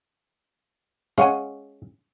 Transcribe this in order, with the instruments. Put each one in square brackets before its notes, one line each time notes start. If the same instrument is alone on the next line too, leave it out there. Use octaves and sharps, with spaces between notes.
[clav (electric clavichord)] G#3 C#4 [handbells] F5 F#5 G#5